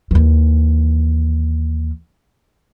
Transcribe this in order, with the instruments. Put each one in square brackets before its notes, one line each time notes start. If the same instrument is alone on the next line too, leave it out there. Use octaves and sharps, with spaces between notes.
[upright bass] D#2 E3